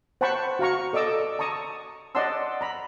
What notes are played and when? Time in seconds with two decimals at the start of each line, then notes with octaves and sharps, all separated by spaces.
0.21 C5 F#5 G5 A5 B5 C#6
0.59 F#4 F5 A#5 C#6
0.93 A4 D5 D#5 D6 E6
1.39 A5 A#5 C#6 D#6
2.15 D5 D#5 F#5 A5 C6 E6
2.61 A#5 B5